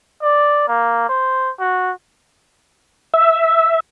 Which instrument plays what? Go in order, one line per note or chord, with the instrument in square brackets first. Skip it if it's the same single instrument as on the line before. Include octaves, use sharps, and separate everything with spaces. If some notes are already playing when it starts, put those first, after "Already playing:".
[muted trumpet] D5
A#3
C5
F#4
[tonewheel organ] E5